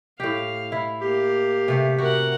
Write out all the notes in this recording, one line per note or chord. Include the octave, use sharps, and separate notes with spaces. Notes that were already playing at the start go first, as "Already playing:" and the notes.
A2 G4 F5
E4
A#3 G4 F5
C3 A3
F#4 A#4 F#5